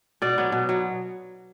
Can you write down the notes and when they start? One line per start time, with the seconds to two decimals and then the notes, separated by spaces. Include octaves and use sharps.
0.22 B2 D5
0.38 F#3 B3
0.52 B2
0.69 F#3